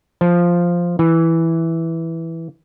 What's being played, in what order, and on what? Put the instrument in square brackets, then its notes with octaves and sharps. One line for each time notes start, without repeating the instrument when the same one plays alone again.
[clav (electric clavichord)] F3
E3